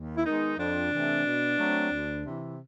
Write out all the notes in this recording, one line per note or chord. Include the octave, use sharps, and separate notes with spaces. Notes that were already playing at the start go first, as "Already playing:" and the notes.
Already playing: D#2
E4
D#3 G#3 B3 D#4
F2 D4
C3 E3 A3 C4
B2
F#3 A3 C4
D2
C3 E3